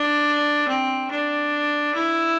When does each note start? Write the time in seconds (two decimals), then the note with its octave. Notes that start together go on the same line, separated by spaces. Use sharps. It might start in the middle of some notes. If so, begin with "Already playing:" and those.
Already playing: D4
0.68 C4
1.11 D4
1.94 E4